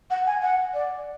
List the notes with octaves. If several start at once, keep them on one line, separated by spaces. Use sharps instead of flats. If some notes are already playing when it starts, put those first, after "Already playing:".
F#5
G#5
F#5
D5